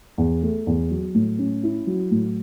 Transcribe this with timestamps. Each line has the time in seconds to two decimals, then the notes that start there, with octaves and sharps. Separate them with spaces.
0.18 E2
0.42 A3
0.67 E2
0.90 F#3
1.15 A2
1.38 C#4
1.63 E4
1.87 F#3
2.11 A2